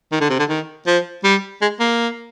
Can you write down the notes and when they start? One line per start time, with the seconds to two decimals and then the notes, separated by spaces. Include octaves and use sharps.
0.12 D#3
0.21 D3
0.29 C3
0.39 D3
0.49 D#3
0.87 F3
1.24 G3
1.62 G#3
1.80 A#3